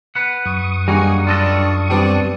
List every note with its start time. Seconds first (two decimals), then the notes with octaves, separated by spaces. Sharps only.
0.15 B4 F#5
0.45 F#2 C#6 D#6
0.88 G2 G3 A#3 D#4 F#4 G#4
1.27 D4 F4 A4 D#5
1.90 G3 B3 C4 D4